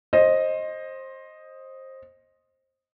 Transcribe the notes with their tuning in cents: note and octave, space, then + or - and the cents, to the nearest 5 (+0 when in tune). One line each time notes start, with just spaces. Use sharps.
C5 +20 D#5 +0